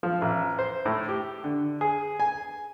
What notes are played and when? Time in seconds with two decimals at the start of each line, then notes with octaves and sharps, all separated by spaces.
0.03 F3
0.21 A1
0.59 C5
0.85 A2
1.09 G4
1.44 D3
1.81 G#4
2.20 G#5